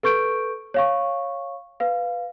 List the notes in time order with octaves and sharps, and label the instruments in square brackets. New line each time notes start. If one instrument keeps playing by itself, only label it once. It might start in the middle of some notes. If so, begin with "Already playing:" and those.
[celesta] A4 B4 C#6 G6 D7
C#5 F5 C#6
B4 F5